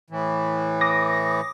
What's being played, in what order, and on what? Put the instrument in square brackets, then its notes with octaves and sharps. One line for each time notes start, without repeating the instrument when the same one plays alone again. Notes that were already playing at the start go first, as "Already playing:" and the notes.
[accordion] A2 E3
[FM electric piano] D6 D#6 A#6